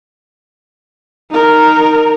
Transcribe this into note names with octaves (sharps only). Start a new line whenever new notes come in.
D#4 A#4